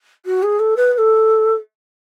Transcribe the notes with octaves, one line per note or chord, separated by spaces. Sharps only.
F#4
G#4
A4
B4
B4
A4